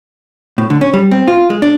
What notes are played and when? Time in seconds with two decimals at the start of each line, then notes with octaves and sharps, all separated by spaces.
0.58 A2
0.70 D3
0.81 C#4
0.94 G3
1.11 C4
1.28 F4
1.50 G#3
1.62 D4